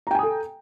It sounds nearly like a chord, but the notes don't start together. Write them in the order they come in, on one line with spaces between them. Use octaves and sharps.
A#5 G5 G#5 D#6 A4